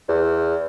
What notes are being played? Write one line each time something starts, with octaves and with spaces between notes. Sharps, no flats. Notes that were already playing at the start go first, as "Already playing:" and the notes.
E2